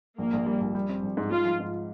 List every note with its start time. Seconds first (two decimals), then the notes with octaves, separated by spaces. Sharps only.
0.18 A#1 A#3
0.33 A#1
0.46 G3
0.61 A#1
0.75 G3
0.89 C4
1.03 A#1
1.17 G#2
1.31 G#2 F4
1.45 F3
1.60 G#2